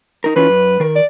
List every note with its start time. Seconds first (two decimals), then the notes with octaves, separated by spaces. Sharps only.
0.24 D#4 A#4
0.36 E3 C#4 F4 B4
0.49 F#2
0.80 D#3 A#4
0.96 D5